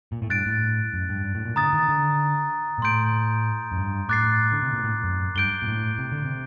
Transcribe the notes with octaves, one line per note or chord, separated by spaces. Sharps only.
A#2
A2
G2 F#6 A6 D7
A2
F#2
G2
G2
A2
A#2
D3 A#5 D#6 A6
D#3
D3
A#2
A2 C6 G6 D7
F#2
G2
A2 D6 F#6 A6 C7
D3
C3
A#2
A2
F#2
G2 G6 D7 G7
A#2
A2
C3
D3
C3